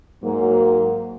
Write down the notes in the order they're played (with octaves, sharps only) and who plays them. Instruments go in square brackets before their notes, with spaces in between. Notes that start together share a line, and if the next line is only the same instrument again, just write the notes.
[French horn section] G#2 F#3 A#3